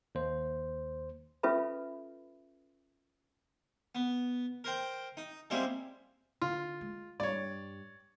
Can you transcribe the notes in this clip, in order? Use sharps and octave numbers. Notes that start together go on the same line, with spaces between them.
D#2 C5
C#4 F4 A4 B4 E5 B5
B3
A#4 C5 G5
D#4
G3 G#3 A#3 C4 E4
D3 F4
G#3
G2 C#5 D5